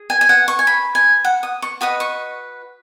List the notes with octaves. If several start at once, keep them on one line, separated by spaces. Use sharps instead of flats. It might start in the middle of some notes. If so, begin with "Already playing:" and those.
Already playing: G#4
G#5
G#5
F#5
C#6
G#5
B5
G#5
F#5
D#6
C#6
F#4 B4 D#5 D#6
C#6